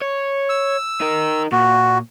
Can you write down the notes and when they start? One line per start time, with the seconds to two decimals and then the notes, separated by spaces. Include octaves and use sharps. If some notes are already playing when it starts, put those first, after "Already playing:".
0.02 C#5
0.49 E6
1.01 D#4 A#4
1.52 A#2 F#4